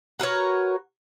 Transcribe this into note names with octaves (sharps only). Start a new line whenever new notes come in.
F#4 A#4 B4 C#5